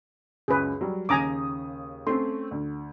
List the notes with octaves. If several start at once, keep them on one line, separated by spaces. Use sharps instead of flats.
C#2 F#2 G#4 B4
F#3 G3
D#2 C#3 G#5 A#5 D6 D#6
A3 C4 C#4 C6
D2